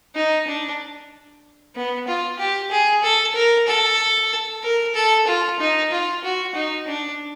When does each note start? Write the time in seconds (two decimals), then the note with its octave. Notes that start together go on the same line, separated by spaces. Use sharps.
0.15 D#4
0.47 D4
1.75 B3
2.08 F4
2.39 G4
2.71 G#4
3.03 A4
3.35 A#4
3.67 A4
4.64 A#4
4.95 A4
5.27 F4
5.60 D#4
5.91 F4
6.23 F#4
6.55 D#4
6.87 D4